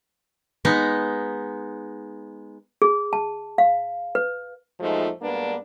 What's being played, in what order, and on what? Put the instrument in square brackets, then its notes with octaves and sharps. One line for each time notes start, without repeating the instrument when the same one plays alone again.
[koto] G#3 B3 D#4
[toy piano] G#4
A5
F5
B4
[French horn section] F#2 A#2 F3 G#3 A3 D#4
G2 G#3 A#3 B3 D4 B4